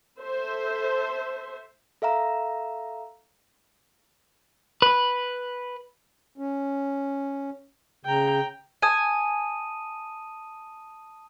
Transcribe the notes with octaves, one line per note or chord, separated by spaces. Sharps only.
A4 C5 E5
A4 E5 F5 A#5
B4
C#4
C#3 G5 A#5
G#5 A5 D#6 D#7